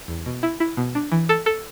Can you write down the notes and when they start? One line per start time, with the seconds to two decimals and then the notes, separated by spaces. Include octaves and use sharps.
0.08 E2
0.26 B2
0.43 E4
0.60 E4
0.77 B2
0.95 D4
1.12 E3
1.29 A4
1.46 A4